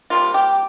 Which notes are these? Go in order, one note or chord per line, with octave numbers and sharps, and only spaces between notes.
C3 G3 A#3 F4
G4